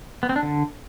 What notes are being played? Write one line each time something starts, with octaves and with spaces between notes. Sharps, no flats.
B3
C4
D4
D3